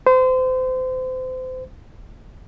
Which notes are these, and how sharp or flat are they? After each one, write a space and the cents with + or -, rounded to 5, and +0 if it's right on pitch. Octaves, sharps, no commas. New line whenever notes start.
C5 -30